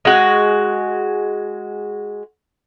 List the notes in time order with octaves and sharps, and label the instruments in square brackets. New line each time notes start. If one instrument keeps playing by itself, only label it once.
[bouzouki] G#3 F#4